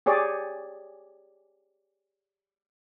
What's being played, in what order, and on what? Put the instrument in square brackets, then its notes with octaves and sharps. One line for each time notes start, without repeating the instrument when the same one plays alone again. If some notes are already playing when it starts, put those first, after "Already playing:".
[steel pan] G4 G#4 C#5 D5